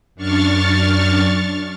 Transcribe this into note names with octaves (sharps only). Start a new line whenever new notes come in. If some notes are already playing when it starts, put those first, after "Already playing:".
F#2 D4 C#6 F6 A6